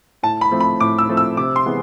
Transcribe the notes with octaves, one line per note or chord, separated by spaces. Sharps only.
A2 A5
B5
F3 A3 C4
B5
A2 D6
E6
F3 A3 C4
E6
C3 D6
C6
E3 G#3 B3